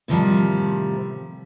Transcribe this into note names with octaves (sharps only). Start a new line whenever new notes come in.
A2 C3 D#3 F3 G3